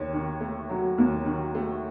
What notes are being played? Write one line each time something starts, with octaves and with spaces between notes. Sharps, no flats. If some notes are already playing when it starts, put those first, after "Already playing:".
Already playing: D#2 C#5
D#3
A3
F#3
D#2
D#3
A3